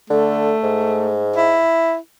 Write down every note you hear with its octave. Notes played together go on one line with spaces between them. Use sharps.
D3 A3
G#2
E4